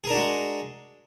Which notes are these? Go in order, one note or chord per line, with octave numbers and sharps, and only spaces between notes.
G#3 D4 F#4 G#4 A#4